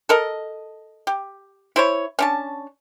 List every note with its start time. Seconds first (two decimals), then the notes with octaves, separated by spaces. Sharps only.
0.09 A4 A#4 D#5
1.07 G4
1.76 E4 C5 C#5
2.19 C#4 D4 A5